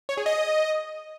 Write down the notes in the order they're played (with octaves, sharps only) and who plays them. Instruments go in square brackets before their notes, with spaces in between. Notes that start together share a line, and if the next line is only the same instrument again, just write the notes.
[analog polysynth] C#5
G#4
D#5